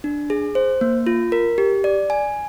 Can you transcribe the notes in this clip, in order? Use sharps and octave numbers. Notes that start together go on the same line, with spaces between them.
D4
G#4
C5
A#3
F4
A#4
G4
D5
G#5